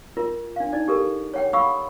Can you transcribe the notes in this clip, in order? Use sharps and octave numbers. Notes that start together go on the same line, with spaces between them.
F4 A#4
D4 F5
D#4 D5
G4 A4 A#4
C#5 F#5 G5
F5 F#5 B5 C#6 D#6 E6